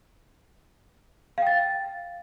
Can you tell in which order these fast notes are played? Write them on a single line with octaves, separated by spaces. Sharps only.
F5 G5 A6